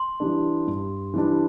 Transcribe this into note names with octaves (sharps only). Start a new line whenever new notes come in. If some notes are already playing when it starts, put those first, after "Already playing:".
Already playing: C6
E3 G3 D4
G2
E3 G3 D4